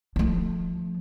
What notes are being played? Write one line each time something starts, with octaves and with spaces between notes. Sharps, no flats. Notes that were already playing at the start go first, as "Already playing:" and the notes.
F3 A3